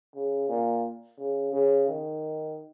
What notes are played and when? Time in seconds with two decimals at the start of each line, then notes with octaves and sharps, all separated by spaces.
0.15 C#3
0.49 A#2
1.18 C#3
1.53 C#3
1.88 D#3